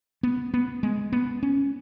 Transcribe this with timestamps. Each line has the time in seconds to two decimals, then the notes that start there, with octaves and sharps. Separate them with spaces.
0.23 B3
0.54 B3
0.83 G#3
1.13 B3
1.43 C#4